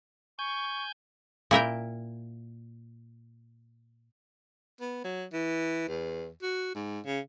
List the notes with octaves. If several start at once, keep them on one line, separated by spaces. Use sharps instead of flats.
G#5 C#6 G6
A#2 E4 A#4 G5
B3
F#3
E3
E2
F#4
G#2
C#3